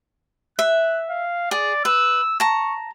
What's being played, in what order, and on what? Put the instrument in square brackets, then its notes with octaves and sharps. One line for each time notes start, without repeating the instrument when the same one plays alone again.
[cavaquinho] E5 [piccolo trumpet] F#6
[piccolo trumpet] F5
[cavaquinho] G#4 [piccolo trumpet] D5
[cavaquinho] B4 [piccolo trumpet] E6
[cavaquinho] A5 A#5 [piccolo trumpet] C#6